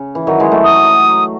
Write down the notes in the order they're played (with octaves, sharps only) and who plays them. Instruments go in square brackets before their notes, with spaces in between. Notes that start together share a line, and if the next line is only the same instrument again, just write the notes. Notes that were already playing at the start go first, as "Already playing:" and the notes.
Already playing: [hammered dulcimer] C#3
E3
D#3 F#3
E3 G#3
F#3 A3
[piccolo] D#6